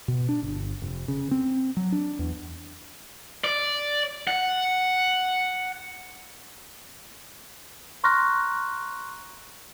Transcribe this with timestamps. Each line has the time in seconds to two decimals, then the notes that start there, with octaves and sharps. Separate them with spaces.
0.08 B2
0.29 D4
0.42 G1
0.82 F1
1.08 C#3
1.31 C4
1.77 F#3
1.92 D4
2.19 E2
3.44 D5
4.27 F#5
8.04 A#5 C6 C#6 F6 F#6 A#6